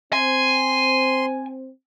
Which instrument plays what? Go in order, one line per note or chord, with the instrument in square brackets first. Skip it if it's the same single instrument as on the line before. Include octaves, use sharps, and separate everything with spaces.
[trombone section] C4 [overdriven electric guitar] G#5 [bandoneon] C6